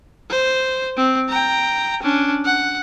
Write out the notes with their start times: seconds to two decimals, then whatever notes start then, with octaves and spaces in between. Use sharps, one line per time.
0.30 C5
0.97 C4
1.29 G5 A#5
2.03 C#4 D4
2.45 F#5